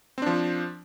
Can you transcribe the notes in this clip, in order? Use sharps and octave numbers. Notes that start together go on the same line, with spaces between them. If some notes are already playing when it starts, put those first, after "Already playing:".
F3 C4 D4